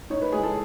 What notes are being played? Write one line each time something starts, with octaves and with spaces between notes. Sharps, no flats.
D#4 C#5
B4
G#3 G#4
A4